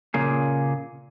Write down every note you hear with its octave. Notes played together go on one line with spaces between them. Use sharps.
A#2 C#3 A#3 G#4